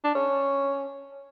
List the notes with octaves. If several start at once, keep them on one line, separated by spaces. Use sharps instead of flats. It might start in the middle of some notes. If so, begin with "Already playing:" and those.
D4
C#4